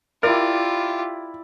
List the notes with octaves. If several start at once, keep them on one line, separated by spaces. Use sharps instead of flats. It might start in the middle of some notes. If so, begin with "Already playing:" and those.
E4 F4 G4 A#4 D5